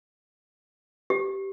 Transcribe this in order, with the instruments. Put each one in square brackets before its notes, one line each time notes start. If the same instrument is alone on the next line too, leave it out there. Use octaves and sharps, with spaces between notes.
[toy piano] G4